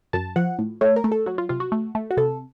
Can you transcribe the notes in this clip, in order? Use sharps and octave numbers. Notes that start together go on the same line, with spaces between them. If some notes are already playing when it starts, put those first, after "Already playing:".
F#2 A5
F3 F#5
A2
A3 C#5
A#4
A3
A4
F#3 F#4
F4
C3 F4
F#4
A3
A3
F#4
C3 A4